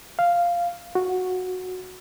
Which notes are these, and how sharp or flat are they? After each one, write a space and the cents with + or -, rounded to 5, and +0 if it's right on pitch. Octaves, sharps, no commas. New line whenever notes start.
F5 -5
F#4 -10